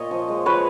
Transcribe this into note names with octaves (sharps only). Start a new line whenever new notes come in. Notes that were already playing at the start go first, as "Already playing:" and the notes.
Already playing: A#2 C#5 D#5
F3
G#3
F3 B4 C#5